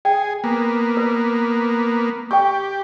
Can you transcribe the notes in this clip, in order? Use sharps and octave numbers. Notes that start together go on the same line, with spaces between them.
G#4 G5
A#3 B3
B4
G4 G5 C#6